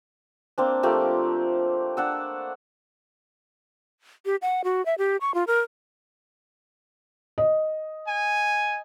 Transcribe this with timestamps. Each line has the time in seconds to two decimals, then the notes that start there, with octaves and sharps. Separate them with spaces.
0.58 A#3 C4 D4
0.83 F3 A3 A#3 G4
1.97 D4 F#5 E6
4.26 G4
4.42 F#5
4.64 F#4
4.86 E5
4.98 G4
5.21 C#6
5.34 F4
5.47 A#4
7.38 D#5
8.07 G#5